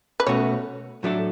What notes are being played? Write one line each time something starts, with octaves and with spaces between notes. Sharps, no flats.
B4
B2 A3 C#4 F#4 C#5
A2 F#3 A3 D4 A4